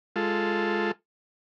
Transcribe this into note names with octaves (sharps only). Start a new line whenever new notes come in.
G#3 F4 A4